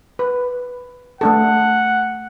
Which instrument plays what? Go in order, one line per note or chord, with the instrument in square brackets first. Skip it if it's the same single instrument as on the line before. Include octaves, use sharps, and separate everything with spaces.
[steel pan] B4
[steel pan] A3 D4 A4 [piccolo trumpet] F#5